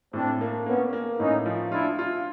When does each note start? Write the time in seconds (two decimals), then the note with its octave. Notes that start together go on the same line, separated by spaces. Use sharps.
0.13 A2 C4 D4
0.41 A#3
0.66 A#3 B3 C#4
0.93 A#3
1.20 A2 C#4 D#4
1.46 F3
1.72 D4 E4 F4
1.99 F4